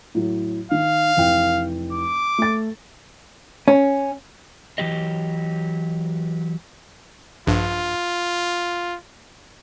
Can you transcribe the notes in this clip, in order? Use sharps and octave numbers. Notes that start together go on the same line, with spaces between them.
A2 F#3
D#3 F5
F1 E3 G5
D6
A3 A6
C#4
E3 F#3 G4 D#5
A#1 G2 F4